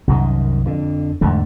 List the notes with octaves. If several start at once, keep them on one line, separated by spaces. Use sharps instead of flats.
C2 F#2 D#3
F2 D3
E2 G#2 D3 A3